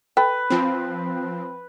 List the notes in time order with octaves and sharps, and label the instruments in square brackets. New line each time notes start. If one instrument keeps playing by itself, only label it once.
[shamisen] A4 G5 [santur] B4
[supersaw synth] F3 C4